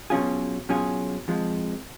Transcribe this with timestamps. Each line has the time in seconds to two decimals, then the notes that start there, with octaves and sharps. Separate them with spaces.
0.10 B2 F#3 C#4 F4 G#4
0.69 B2 F#3 C#4 F4 G#4
1.28 F2 F3 G#3